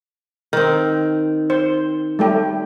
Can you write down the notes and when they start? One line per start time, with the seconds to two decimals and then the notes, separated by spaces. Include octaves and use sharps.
0.53 D#3 C4
1.50 C5
2.19 G3 A3 G4